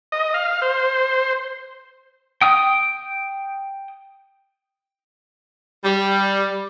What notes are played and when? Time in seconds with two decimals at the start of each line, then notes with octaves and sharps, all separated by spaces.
0.12 D#5
0.34 F5
0.62 C5
2.41 G5 D#6
5.84 G3